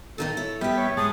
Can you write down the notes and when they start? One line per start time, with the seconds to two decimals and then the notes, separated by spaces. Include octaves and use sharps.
0.18 A#2 D#3 D#4 A4
0.37 E4 C#5
0.61 A2 G3 B3 G4 E5
0.77 C#5
0.97 G#2 G#3 A5 D#6